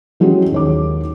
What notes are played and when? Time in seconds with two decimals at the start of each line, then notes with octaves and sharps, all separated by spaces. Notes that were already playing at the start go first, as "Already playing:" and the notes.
0.20 E3 F#3 G#3 C#4 F#4 G4
0.52 D#2 C#5 D6